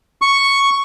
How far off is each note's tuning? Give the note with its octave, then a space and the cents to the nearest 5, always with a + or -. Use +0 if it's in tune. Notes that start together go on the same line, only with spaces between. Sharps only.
C#6 +0